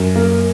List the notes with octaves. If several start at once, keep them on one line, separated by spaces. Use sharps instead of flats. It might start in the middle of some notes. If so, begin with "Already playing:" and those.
Already playing: F#2
A#3